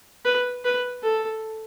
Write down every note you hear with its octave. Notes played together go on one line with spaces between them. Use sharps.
B4
B4
A4